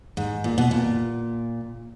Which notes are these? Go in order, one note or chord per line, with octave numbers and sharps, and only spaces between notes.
G#2
A#2
B2
A#2